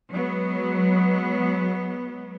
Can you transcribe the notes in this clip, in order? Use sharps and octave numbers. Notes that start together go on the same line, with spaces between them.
F#3 G#3 B3